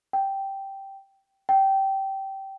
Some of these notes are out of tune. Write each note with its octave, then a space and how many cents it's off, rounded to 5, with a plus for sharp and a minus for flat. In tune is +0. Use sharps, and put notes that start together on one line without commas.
G5 -5
G5 -15